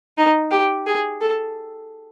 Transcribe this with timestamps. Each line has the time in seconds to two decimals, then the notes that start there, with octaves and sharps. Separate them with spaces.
0.18 D#4
0.51 G4
0.86 G#4
1.21 A4